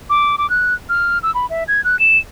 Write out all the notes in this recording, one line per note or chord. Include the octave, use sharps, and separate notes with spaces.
D6
D6
F#6
F6
E6
B5
E5
G#6
F#6
E7